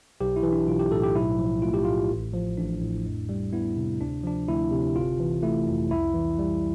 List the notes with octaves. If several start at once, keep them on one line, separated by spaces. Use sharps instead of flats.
B1 G4
E4
E3
D4
B1 F4
G4
A2 A4
G4
B1 E4
F3
A3 F4
G4
A2 F4
A1
F3
A1 D4
A2
F2
G3
B3 E4
C3
D2 D4
F3 D4
D2 E4
C3
G1 F4
E3
A3 E4
F2
C2 E4
E3
G3